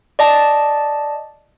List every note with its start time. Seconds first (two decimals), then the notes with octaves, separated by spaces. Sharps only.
0.19 D5 D#5 A5